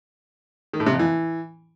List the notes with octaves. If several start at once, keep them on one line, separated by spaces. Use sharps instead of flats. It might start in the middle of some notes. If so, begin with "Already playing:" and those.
D#3
A2
C3
F2
E3